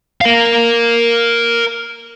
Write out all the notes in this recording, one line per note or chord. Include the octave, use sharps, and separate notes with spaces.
A#4 F5